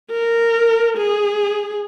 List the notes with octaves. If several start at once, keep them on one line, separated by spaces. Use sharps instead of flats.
A#4
G#4